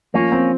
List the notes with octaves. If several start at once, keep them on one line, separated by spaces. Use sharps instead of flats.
F3 A#3 C#4
C4